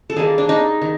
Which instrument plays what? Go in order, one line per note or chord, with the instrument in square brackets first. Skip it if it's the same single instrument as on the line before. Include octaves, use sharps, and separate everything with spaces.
[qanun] A4
D#3 G3 A#3 G#4
D4
D#4
D#3